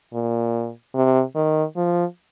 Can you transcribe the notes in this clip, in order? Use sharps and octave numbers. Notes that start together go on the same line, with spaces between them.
A#2
C3
D#3
F3